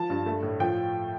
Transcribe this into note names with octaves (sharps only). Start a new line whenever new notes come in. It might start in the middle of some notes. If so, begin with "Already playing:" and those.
Already playing: F3 A5
G2
A3
A2
F3 G5